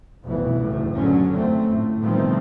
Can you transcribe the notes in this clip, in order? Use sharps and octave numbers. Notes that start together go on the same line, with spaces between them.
F1 C2 B2 E3
F#1 D2 A2
D3 F#3 C#4
F2 A3 C4
A2
B2 D#3 F3 G3 A3 C4